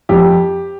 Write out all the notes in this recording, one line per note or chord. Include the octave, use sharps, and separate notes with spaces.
F2 G4